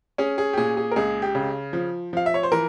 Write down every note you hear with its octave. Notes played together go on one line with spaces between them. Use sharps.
C#4 G#4
G#4
G4
A#2 G#4
G#4
A#4
C#2 G#4
G4
C#3
F3
F3 F5
E5
C#5
C5
E3 A#4